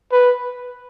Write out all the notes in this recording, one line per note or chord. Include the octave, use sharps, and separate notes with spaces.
B4